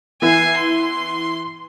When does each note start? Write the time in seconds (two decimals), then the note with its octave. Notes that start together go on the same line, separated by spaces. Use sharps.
0.22 E3 B3 E4 G#5 C7
0.57 C6